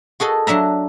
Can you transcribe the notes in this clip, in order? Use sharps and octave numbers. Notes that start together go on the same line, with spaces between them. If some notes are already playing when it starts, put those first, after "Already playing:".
F#4 G#4 A4 D#5
F#3 D4 E5 A#5